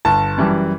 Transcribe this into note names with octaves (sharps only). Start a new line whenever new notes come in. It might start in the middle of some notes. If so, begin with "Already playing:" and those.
G1 A5
F#2 E3 G3